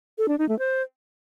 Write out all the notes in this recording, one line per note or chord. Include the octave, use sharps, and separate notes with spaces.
A4
D4
D#4
A3
C5